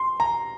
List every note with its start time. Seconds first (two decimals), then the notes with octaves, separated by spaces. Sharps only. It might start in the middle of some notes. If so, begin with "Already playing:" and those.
Already playing: C6
0.20 A#5